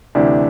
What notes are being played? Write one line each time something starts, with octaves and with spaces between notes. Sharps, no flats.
D2 C3 E3 D4